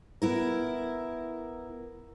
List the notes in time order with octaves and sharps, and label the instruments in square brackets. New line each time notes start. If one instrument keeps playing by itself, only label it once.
[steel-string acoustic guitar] B3 E4 A#4